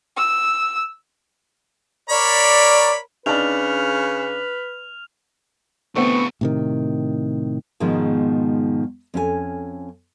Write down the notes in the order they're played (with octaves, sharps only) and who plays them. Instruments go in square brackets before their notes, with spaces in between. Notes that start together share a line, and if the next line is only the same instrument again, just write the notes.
[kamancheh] E6
[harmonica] A#4 C#5 B5 [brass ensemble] D5
[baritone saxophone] C#3 [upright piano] D4 D#4 [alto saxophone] B4 [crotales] F6 F7
[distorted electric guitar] E2 B2 [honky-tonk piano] D3 A3 C4 [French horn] B3 [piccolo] C#6
[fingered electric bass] A2 C3 D#3
[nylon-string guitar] G#2 B2 D#3 F3 G#3
F2 C#4 F4 G#5